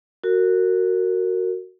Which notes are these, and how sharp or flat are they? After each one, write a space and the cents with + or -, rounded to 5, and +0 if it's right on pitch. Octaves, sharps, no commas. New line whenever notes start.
F#4 +0 A#4 -25